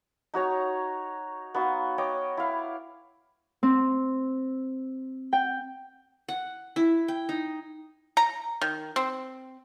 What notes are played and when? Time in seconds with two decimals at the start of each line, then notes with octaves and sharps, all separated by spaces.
0.34 D#4 F#4 C#5 A#5
1.55 B3 D#4 F#4 F5
1.98 C#5 D#5 G5 D6
2.37 E4 F5
3.63 C4
5.33 G5
6.28 F#5
6.76 E4
7.08 G5
7.29 D#4
8.17 A#5
8.61 D#3
8.96 C4